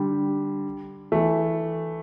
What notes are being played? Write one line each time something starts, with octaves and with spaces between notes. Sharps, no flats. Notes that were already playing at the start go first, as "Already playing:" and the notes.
Already playing: D3 G3
E3 A3